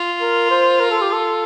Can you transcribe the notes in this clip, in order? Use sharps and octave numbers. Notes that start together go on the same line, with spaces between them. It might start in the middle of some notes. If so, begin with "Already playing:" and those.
Already playing: F4
A#4
C5
A#4
A4
G4
A4